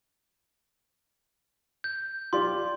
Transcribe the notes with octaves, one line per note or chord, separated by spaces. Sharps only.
G6
F4 G4 D5 C6